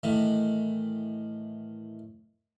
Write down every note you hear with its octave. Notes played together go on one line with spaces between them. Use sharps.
A2 D#3 E3